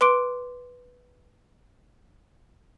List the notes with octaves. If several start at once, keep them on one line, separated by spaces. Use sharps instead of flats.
B4 C6 D6 D7